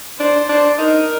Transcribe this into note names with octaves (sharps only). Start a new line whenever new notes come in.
D4 C5
D4
D#4 A#4